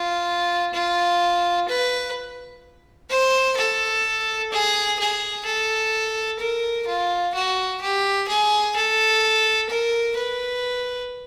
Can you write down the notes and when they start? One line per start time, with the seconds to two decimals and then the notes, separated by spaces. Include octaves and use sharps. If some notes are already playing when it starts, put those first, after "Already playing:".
Already playing: F4
0.74 F4
1.69 B4
3.10 C5
3.57 A4
4.52 G#4
4.99 G#4
5.46 A4
6.40 A#4
6.87 F4
7.35 F#4
7.82 G4
8.28 G#4
8.76 A4
9.69 A#4
10.17 B4